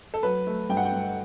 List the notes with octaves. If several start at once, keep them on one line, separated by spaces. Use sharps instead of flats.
A4
F#3 B4
A3
G2 G5
F#5
G5
G2